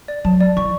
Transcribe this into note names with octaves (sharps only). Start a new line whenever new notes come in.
D5
F#3 A5
D5
E3 C#6